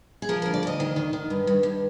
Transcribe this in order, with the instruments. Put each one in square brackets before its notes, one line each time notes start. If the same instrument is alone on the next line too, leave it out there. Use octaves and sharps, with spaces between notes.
[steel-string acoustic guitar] G#4
F3 A#4
D2 A#4
D5
D2 D#5
D#3
D#3
D#3
G2
G2
G2